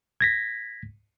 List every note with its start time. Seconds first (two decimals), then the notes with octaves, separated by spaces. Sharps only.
0.21 G#6 A#6 B6